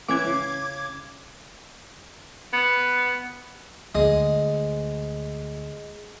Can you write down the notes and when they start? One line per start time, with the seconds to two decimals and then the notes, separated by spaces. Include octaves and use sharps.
0.08 E3 C#4 E5 D6 G#6
0.26 C#3
2.53 B3
3.95 D2 G#3 D#5